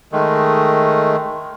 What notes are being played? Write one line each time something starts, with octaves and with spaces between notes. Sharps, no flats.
D#3 G#3 A3